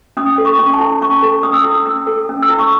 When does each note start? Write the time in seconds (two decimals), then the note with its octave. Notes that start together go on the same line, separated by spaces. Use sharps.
0.17 C#4 D#6
0.38 A4
0.45 C#6
0.59 C#4
0.73 A5
0.80 E4
1.02 C#4 C#6
1.23 A4
1.43 C#4 D#6
1.54 E6
1.62 E4 D#6
1.86 C#4 E6
2.07 A4
2.29 C#4
2.42 E6
2.49 E4
2.59 C#6